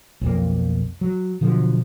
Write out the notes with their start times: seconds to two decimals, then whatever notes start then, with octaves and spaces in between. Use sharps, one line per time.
0.21 B1 F2 A#3
1.01 F#3
1.41 B2 D3 F3 F#3